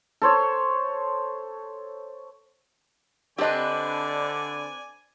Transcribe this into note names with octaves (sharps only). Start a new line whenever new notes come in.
A4 C5 C#5
D3 C4 D4 G4 B4 D5 D#5 G#5